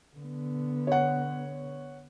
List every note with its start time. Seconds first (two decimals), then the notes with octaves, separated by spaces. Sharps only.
0.17 D3 B3
0.87 C#5 F#5